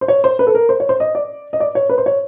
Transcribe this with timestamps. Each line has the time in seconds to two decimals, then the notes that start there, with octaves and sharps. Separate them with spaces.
0.01 C5
0.08 C#5
0.24 C5
0.39 B4
0.47 A4
0.55 A#4
0.69 C5
0.80 C#5
0.89 C5
1.00 D#5
1.15 D5
1.53 D#5
1.60 D5
1.75 C#5
1.89 B4
1.98 C5
2.06 C#5